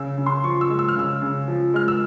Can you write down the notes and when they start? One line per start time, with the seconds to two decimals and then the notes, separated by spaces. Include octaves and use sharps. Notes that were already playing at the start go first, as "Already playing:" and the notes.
Already playing: C#3 E6
0.18 C#3
0.26 C6
0.44 F3 C#6
0.61 E6
0.70 G#3
0.79 E6
0.88 F6
0.96 C#3 E6
1.22 C#3
1.48 F3
1.74 G#3 F6
1.88 E6